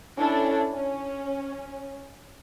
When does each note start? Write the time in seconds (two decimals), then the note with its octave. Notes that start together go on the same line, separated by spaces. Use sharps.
0.18 C#4 D4 E4 A4
0.73 C#4